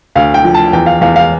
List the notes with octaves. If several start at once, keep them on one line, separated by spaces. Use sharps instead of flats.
D2 F5
G5
F3
A5
E2 G5
F5
E2 F5
F5